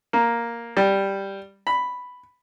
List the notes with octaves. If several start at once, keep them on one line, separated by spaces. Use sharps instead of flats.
A#3
G3
B5